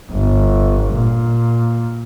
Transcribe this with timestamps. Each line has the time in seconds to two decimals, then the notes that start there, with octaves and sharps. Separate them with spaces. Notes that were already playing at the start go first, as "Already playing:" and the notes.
0.12 G1
0.93 A#2